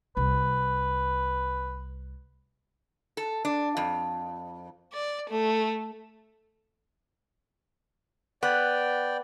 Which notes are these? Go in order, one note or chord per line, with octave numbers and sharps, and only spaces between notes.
C2 B4
A4
D4
F2
D5
A3
B3 D5 G5